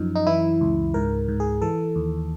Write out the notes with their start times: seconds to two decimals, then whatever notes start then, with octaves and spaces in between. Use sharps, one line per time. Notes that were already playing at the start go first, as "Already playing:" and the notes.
Already playing: F#2 F3 D#4
0.15 D#4
0.27 E3 E4
0.61 C#2
0.94 G#2 A#4
1.28 G#2
1.40 G#4
1.62 E3 A4
1.96 D#2